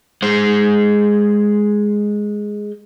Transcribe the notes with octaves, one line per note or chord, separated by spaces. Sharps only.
G#3 C5